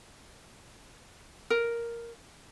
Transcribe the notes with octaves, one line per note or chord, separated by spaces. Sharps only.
A#4